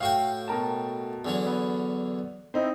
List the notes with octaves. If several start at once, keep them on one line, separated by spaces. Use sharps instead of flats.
A2 F#4 F5 G5
B2 A#4 A5
E2 D3 F#3
B3
C4 D#4 E4